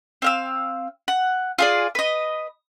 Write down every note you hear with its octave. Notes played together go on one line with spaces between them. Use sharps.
C4 F5 E6
F#5
F4 G#4 D5
B4 D#5